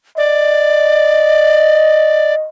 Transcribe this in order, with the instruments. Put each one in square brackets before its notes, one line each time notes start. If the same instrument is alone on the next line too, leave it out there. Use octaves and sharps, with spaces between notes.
[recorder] D5 [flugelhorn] D#5